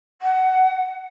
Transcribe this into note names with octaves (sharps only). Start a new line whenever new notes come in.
F#5